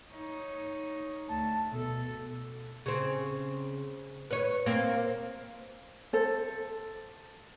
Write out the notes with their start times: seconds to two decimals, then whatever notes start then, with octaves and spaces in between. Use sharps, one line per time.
0.11 D#4 C#5
1.28 D2 A5
1.72 B2 A4
2.86 C#3 C4
4.31 B4 C#5
4.66 A#3 C4
6.13 A4 C5